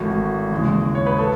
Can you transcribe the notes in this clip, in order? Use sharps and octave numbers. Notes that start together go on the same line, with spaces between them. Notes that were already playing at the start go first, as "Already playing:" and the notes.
Already playing: G#1 G#2 E3 A3 E4 F#4
D#2 C#3 E3 G#3
C#5
B4
A4